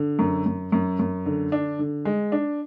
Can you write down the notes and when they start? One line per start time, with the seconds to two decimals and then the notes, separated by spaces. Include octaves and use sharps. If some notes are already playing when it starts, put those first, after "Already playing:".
Already playing: D3
0.19 F#2
0.46 F#2
0.72 F#2
0.99 F#2
1.26 D3
1.52 D4
1.79 D3
2.05 G#3
2.32 D4